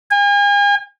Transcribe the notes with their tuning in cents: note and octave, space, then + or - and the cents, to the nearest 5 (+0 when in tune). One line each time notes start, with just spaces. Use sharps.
G#5 -40